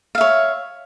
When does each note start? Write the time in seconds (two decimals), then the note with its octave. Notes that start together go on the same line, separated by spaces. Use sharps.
0.15 F5
0.18 E5
0.21 C#5